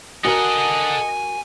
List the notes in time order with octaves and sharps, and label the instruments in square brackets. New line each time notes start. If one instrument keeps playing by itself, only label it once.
[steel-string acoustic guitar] F#4 A#4 A#5 [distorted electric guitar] A4 F#5 [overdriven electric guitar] D#5 [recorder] G#5